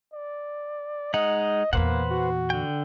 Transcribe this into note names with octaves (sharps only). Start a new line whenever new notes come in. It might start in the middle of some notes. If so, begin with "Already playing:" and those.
D5
G#3 D#4 D#5 F#5
E2 A#2 A#3 B4 C5 F#5
F#4
D3 G5